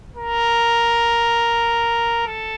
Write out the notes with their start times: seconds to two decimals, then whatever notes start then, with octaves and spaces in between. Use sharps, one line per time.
0.16 A#4
2.27 A4